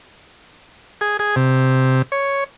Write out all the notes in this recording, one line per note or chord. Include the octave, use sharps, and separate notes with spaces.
G#4
G#4
C3
C#5